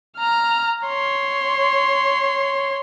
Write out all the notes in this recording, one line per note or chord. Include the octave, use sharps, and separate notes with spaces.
A#5 F6
C#5 C6